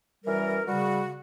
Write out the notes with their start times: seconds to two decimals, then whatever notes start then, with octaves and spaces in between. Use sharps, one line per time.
0.23 F#2 E3 G3 A#4
0.66 C#3 G3 F#4